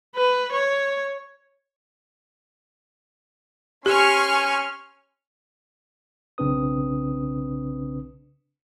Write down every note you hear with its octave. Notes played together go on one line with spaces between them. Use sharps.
B4
C#5
C#4 G4 G#5 C6 C#6 F6
B1 C#3 C4 D4 B4 D#6